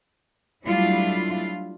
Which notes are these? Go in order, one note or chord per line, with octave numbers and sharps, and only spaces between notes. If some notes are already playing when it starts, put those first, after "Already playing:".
F#3 G3 A3 D4 E4 F4